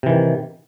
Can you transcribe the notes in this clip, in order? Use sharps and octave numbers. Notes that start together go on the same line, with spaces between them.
C3 D#3 E3